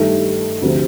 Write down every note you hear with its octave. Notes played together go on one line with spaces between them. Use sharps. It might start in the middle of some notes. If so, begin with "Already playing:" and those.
Already playing: G2 D#3 A3
D2 C3 F3